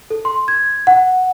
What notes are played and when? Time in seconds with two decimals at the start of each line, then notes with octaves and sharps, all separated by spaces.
0.10 A4
0.25 C6
0.48 G#6
0.87 F#5